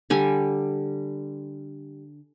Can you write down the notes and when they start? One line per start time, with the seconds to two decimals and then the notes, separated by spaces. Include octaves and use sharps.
0.10 D3 G3 G#5